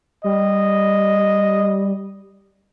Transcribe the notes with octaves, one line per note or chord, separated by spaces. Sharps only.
G3 D#5